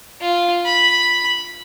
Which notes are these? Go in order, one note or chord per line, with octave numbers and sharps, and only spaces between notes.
F4
B5